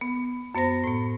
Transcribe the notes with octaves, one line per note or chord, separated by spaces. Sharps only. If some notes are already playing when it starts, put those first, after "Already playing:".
B3
F#2 B3 C5 A#6
A2 B3